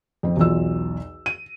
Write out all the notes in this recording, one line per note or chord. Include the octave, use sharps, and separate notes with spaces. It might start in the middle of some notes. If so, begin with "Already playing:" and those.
F2 C4
B1 E2 F4 E6
D#7